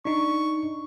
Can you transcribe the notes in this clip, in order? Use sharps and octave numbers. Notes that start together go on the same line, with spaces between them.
D4 D#4 C#6